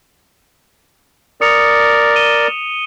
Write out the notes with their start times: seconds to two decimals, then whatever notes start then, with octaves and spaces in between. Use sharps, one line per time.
1.41 A#4 D5 D#6 C#7 F7
2.16 D#7 E7 G7